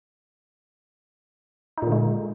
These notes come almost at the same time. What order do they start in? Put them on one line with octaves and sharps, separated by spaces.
D#4 A#2 D3 G#3